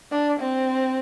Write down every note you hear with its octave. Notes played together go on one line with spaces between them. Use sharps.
D4
C4